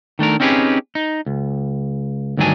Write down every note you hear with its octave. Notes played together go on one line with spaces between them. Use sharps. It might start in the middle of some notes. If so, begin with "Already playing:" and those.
D#3 A3 D4 A#4
C4 C#4 D#4 G4 G#4 B4
D#4
C#2
D2 G2 D#3 F#3 D4 G#5